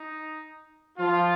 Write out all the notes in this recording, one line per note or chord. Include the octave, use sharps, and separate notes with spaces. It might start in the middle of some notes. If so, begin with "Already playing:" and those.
Already playing: D#4
F3 F4